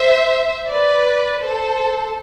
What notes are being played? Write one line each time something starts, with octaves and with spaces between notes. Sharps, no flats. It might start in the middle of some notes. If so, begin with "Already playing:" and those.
Already playing: C5 E5
B4 D5
A4 C5